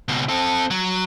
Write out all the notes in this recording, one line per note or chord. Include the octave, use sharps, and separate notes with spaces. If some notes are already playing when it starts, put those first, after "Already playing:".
C#2 B2
C4 A4
F#3